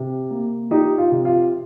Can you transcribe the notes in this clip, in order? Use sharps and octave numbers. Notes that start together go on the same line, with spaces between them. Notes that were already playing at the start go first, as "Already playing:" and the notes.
Already playing: C3
A#3
F3 D#4 G4
F4
C3
F4